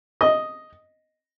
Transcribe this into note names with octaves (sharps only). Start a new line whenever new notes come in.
D#5